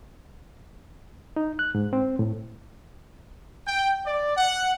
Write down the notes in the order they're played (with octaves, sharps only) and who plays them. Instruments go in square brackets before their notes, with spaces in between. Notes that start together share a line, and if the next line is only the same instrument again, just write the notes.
[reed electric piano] D#4
F#6
G#2
C4
A2
[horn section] G5
D5
F#5